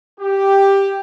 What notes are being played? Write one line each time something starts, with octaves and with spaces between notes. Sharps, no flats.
G4